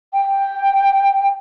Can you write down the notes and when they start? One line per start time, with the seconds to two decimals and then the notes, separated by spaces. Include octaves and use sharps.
0.13 G5